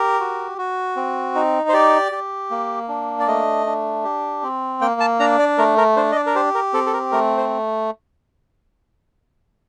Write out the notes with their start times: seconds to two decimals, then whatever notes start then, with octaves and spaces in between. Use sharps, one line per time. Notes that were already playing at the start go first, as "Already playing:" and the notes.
Already playing: G4 A#4
0.20 F#4
0.58 F#4
0.96 C4
1.35 D#4
1.69 C5
1.73 G4 D5
2.12 G4
2.50 A#3
2.89 D4
3.20 D5
3.27 A3 D#5
3.66 D4
4.04 G4
4.43 C4
4.81 A#3 G5
5.00 A5
5.20 D4 A#5
5.39 D5
5.58 A3 A#4
5.78 A#4
5.97 D4 C5
6.12 D#5
6.16 D5
6.26 A#4
6.35 G4 C5
6.55 A#4
6.73 C4 A4
6.86 A4
6.93 A#4
7.12 A3 A#4
7.38 C5